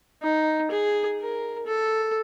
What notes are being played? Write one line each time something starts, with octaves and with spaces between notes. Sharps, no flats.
D#4
G#4
A#4
A4